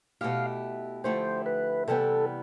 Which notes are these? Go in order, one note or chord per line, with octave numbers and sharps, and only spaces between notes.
B2 A3 E4 G4 F5
D3 F3 A3 E4 G4 C5
B4
C3 E3 G3 B3 A4